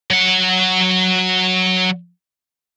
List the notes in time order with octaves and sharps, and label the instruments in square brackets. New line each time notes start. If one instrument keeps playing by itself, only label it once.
[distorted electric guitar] F#3 F#5